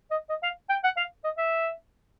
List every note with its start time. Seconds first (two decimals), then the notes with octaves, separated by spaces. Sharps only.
0.11 D#5
0.29 D#5
0.43 F5
0.70 G5
0.84 F#5
0.97 F5
1.24 D#5
1.38 E5